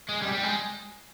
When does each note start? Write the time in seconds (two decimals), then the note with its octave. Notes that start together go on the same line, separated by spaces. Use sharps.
0.09 G#3
0.22 G3
0.33 G3
0.43 G#3